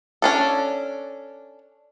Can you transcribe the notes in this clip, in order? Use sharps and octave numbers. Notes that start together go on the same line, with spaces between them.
C#4 D4 A4